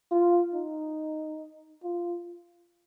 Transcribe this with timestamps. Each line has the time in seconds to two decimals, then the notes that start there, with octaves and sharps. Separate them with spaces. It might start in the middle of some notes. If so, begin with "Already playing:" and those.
0.11 F4
0.54 D#4
1.83 F4